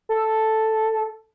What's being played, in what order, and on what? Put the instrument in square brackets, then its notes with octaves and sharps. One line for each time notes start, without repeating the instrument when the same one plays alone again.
[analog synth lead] A4